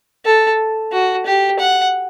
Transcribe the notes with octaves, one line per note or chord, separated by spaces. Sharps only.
A4
F#4
G4
F#5